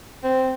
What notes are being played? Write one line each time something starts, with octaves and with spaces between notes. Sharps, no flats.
C4